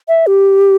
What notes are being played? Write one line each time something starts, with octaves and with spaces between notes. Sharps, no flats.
E5
G4